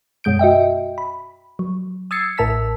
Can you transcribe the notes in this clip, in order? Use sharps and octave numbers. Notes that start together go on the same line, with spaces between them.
F#2 B2 G#3 G6 D7
F#4 D#5 E5 G5
B5
F#3
D#6 E6 G#6 A6 C7 C#7
A1 A2 A#4 A5 E6 B6